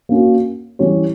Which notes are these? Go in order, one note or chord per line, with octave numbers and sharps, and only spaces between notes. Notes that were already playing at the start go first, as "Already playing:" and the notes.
A#3 C#4 F#4
E3 G3 C#4 G4 C#5